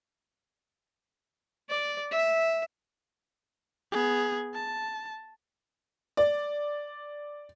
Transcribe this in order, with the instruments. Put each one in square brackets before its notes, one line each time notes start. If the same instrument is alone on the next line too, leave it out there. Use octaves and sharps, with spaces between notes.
[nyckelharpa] D5
E5
[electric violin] B3 G#4
A5
[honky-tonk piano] D5